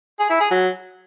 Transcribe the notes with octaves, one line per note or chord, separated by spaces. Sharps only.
G#4
E4
G#4
F#3